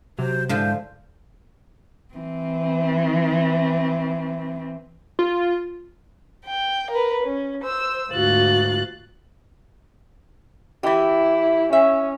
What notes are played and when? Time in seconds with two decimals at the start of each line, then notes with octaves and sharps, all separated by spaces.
0.19 C3 F#3 C5
0.49 G#2 D3 F3 G#3 E4 F4 C5
2.14 E3 C4
5.19 F4
6.45 G5
6.90 A#4 B4
7.23 C#4
7.62 C5 E6
8.11 D2 G#2 F4 F#4 F#6 A6
10.83 E3 E4 G4
11.73 C#4 E5